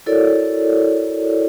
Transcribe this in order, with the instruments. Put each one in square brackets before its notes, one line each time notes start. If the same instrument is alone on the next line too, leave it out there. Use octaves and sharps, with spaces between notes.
[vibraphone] E4 F#4 A4 A#4 C#5 D5